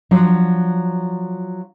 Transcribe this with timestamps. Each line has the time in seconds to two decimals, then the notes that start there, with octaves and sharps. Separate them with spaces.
0.11 F3 F#3 D4